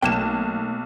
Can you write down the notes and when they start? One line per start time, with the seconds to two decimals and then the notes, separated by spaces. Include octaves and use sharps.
0.02 B1 A3 A#3 G5 E7